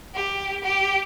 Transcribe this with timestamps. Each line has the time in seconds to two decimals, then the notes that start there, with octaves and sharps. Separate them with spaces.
0.14 G4
0.63 G4